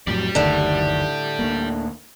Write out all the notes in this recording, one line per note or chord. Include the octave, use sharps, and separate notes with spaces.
F2 A2 F#3 G4 D5
F#1 D2 A2 D3 D#3
D2 G#3 A#3